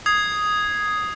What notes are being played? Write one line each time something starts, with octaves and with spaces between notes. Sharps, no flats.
D#6 G#6 C7